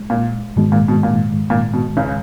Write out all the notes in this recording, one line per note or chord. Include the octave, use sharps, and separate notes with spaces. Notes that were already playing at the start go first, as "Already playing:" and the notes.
Already playing: G#3
A#2
G#2 B2 D#3 G#3
A#2
B2
A#2
A#2
B2
C#2 C#3